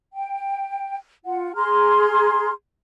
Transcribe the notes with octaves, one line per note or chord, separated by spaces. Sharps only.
G5
F4 F#5
G#4 A#5 C6 F6